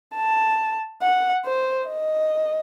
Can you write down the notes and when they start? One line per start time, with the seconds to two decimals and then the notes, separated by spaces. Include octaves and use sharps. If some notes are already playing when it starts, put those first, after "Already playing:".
0.15 A5
1.02 F#5
1.45 C5
1.88 D#5